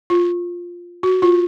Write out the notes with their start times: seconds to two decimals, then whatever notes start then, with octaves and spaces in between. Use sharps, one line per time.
0.10 F4
1.03 F#4
1.22 F4